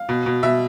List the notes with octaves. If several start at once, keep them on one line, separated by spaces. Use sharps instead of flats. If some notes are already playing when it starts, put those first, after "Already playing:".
Already playing: F5
B2
B2
B2 E5